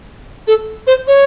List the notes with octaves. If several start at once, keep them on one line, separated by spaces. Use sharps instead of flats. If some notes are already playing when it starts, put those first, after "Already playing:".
A4
C5
C#5